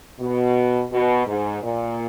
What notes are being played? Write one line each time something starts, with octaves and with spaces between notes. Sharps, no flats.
B2
B2
G#2
A#2